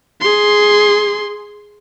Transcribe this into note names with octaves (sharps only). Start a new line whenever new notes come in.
G#4 C6